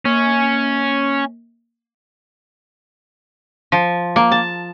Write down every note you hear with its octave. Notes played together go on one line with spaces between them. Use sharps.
A#3 C#4
F3
A#3
A5